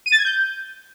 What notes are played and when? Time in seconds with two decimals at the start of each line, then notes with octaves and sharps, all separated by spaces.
0.06 D#7
0.12 A6
0.19 G#6
0.25 G6